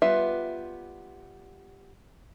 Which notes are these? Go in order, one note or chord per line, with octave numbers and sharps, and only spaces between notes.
G3 B3 F4 E5